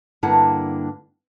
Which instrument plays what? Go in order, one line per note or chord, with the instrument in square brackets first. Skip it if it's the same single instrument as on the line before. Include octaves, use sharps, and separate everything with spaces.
[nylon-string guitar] G2 D3 A#3 D4 E4 F#5